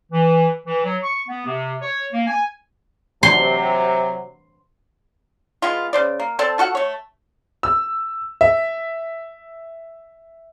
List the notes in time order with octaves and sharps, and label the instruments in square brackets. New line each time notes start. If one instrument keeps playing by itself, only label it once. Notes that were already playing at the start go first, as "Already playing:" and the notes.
[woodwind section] E3
E3
F#3
C#6
B3
C3
C#5
A#3
G#5
[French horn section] C3 F#3 [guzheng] C6
[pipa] G#3 B3 F4
C#3 C5 D5
A#3
C4 A4 D5 A5
F4 F#4 A4 F#5
A3 C#5
[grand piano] E6
E5